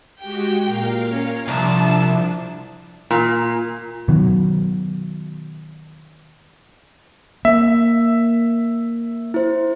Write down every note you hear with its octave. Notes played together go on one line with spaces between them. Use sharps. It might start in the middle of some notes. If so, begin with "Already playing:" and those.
G#3 F#4 G4 G5
A#2 A#4 F5
C#4
C2 F3 D4 A5
A#2
B2 D#3 F#3
A#3 E5
E4 C5